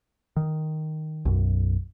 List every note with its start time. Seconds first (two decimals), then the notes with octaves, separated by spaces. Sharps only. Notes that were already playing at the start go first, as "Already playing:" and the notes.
0.37 D#3
1.25 B1 F#2